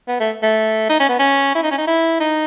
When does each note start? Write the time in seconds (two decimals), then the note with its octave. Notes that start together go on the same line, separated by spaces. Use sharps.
0.08 B3
0.20 A3
0.42 A3
0.89 D#4
1.00 C#4
1.09 B3
1.19 C#4
1.55 E4
1.63 D#4
1.71 C#4
1.78 D#4
1.87 E4
2.20 D#4